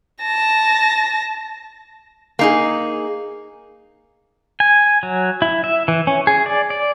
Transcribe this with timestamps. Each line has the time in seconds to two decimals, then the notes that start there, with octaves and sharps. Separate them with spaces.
0.22 A5 A#6
2.39 A#3 D#4 G#4
4.60 G#5
5.03 F#3
5.42 E4
5.64 E5
5.88 E3
6.07 C#4
6.27 G#4
6.46 D5
6.70 D5